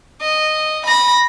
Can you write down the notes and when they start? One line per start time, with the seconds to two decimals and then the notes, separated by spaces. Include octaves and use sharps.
0.22 D#5
0.86 B5 A#6